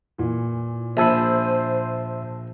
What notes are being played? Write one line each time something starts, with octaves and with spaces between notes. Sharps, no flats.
A#2 E3
A#1 C5 E5 G#5 A5 B5 E6